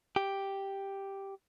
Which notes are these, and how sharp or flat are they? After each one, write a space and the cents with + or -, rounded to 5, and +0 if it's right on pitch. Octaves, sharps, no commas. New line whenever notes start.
G4 +0